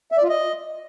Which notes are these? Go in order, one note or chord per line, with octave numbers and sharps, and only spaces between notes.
E5
D5
F4
D#5